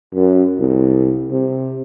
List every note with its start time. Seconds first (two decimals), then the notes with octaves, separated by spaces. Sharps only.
0.14 F#2
0.59 C2
1.31 C3